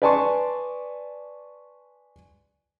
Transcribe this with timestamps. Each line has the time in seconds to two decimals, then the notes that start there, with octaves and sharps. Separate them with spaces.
0.02 B4 D5 G#5 A5 C6 C#6